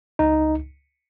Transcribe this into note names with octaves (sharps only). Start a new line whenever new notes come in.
C#2 D#4